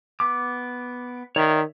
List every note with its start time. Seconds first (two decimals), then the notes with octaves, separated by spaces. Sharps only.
0.20 B3 D6
1.36 D#3 C#5 D5 E5